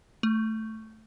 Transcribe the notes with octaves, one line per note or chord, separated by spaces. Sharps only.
A3